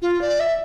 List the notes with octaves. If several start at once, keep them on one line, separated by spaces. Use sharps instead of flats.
F4
D5
E5